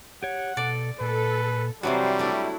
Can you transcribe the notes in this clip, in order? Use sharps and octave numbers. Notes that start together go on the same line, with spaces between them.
G4 C#5 F#5
B2 A4 D5
A#2 A4 B4
C3 E3 F#3 G3 D4 F#4 C5
A3 D4 E4